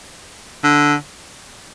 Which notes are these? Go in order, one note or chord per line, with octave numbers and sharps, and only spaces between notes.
D3